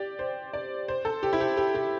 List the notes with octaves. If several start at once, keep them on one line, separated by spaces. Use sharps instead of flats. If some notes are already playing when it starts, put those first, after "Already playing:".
Already playing: G4 D5
C5
D5
C5
A4
G4
E4
G4
G4
G4